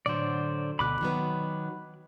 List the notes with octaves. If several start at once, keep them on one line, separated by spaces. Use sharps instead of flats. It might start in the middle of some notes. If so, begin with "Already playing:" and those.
A2 D3 F#3 C5 D5
D2 B2 B5 D6 F#6
D#3 F#3 B3